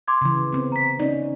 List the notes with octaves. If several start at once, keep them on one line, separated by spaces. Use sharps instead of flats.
C6 D6 G#6
C#3 E3
B3 C4
A#5 B6
C#4 D#4 D5